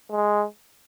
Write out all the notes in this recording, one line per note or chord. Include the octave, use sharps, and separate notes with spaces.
G#3